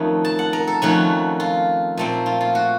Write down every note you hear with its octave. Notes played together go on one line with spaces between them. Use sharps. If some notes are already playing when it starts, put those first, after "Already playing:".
Already playing: F2 D#3 A3 C#4
A5
F#5
A#4
A4
F2 D#3 A3 C#4 F#4
F4
A#2 A3 C4
F4
F4
F#4